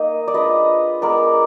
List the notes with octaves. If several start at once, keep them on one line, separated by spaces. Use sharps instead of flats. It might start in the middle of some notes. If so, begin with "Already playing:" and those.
Already playing: A#3 D#4 D#5
D5
G#3 D4 F4 B4 D#5
G#3 B3 D4 A#4 D5